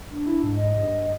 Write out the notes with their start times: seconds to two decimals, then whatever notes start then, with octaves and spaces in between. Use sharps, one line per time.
0.11 D4
0.26 E4
0.43 G#2
0.55 D#5
0.76 G2